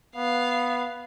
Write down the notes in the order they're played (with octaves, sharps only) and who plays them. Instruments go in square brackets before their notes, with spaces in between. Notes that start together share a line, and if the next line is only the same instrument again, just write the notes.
[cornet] B3 [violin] F5